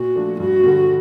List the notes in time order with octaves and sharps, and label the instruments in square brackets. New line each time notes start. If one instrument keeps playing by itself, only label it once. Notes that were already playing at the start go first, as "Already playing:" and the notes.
Already playing: [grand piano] A#2 [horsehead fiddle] F#4
[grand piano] F3 A3 D4
[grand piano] G2 [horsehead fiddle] F#4
[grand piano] D3 G3